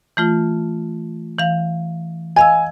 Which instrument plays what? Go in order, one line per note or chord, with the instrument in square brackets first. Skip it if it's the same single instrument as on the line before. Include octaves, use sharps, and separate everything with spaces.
[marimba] E3 A3 F4
E3 F5
[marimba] D#5 F5 E6 [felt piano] G#5